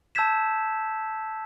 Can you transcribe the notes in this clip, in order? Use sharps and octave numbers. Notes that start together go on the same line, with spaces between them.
A5 E6 G6 G#6 B6 E7